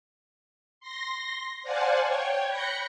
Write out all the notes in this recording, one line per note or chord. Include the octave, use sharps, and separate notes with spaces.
C6 A#6
C5 D5 F5 F#5 G#5 A5
C#5 G5 G#6
B5 F#6 G6 A#6 C#7